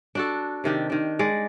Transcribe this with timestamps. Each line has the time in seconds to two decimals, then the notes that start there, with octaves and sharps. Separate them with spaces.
0.15 D4 F#4 A4
0.64 C3 D#3 D4 G4
0.90 D#3 D4
1.19 G#3 D5